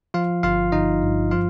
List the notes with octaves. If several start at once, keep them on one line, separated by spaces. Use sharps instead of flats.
F3 F4 F5
G1 F4 F5
G1 D#4 D#5
G2
F3 F4 F5